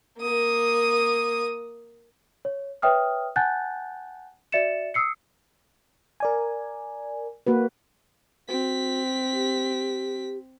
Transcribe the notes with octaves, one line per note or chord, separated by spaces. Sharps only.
A#3 D#6
C#5
B4 C#5 E5 G5 D#6 F6
F#5 G#5 A5 F#6 G6 A6
F#4 D5 E5 A6 C#7 E7
D#6 E6 C7 C#7
A#4 D5 G#5
A#3 F#4 B4
C4 F#4 B6
G4